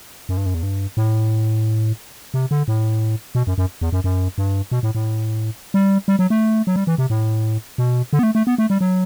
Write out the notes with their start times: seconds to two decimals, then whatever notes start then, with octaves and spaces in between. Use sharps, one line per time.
0.29 F#2
0.37 G2
0.46 F#2
0.54 E2
0.63 G2
0.97 A2
2.34 C3
2.51 D3
2.68 A2
3.35 B2
3.47 F#2
3.58 F#2
3.81 E2
3.92 F#2
4.04 F#2
4.38 G2
4.72 B2
4.83 A2
4.95 A2
5.74 G3
6.08 G3
6.19 F#3
6.30 A3
6.67 F#3
6.76 G3
6.87 E3
6.98 C3
7.10 A2
7.78 B2
8.13 D3
8.19 B3
8.23 A3
8.35 A3
8.47 B3
8.58 A3
8.70 G3
8.81 F#3